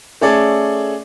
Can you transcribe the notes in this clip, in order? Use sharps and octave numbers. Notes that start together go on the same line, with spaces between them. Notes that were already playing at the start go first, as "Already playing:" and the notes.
A3 C#4 G#4 A4 D5